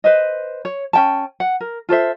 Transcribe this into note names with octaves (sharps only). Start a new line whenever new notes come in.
B4 C5 D#5
C#5
C#4 G5 A5
F#5
A#4
F4 A4 C5 E5